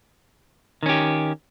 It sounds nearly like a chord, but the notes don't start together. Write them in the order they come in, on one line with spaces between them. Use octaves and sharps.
D#3 C#4 G4